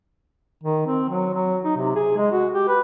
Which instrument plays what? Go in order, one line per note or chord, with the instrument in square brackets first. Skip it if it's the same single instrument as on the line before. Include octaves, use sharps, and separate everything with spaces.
[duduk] D#3
C4
F#3
F#3
D#4
C3
G#4
G#3
F#4
G4
B4